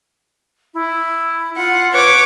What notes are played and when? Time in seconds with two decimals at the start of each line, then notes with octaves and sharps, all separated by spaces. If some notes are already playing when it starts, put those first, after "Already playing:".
0.74 E4
1.57 F4 F#5
1.93 B4 C#5 D6